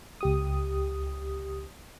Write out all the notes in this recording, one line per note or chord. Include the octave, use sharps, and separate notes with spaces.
C#2 G4 D#6